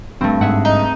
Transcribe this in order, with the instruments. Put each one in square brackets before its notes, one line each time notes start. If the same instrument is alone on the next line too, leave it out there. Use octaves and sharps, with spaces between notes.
[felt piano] G2 [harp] A3 C4
[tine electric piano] G#2 [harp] G#4 E5 F#5
[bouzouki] D#4